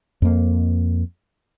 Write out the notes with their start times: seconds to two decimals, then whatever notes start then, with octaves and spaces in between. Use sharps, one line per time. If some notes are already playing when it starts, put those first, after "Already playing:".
0.22 F2 A#3